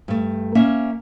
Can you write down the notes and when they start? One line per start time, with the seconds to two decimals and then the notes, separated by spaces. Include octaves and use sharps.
0.08 G2 A3
0.55 A#3 C#4 E5